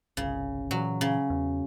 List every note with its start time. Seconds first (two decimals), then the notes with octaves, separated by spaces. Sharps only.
0.17 G1 C2 C#3
0.71 A#2 E3 F#3
1.01 C#3
1.30 E2